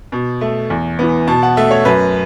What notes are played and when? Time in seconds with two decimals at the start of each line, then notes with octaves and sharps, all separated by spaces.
0.12 B2
0.41 A3
0.70 E2
0.99 E3 B3
1.27 B2 A5
1.43 F#5
1.57 A3 E5
1.71 C#5
1.85 F#2 B4